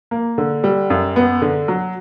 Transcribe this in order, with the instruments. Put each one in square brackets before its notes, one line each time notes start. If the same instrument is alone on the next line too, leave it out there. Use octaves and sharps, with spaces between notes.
[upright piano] A#3
D3
G3
F#2
B3
D3
F#3